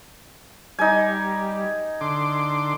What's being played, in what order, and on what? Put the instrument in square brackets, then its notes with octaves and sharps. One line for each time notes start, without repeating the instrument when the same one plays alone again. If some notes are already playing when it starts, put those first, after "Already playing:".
[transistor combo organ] G3 [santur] D#4 G#5
[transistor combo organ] D3 C6 D6